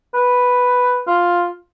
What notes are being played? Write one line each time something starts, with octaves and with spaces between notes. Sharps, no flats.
B4
F4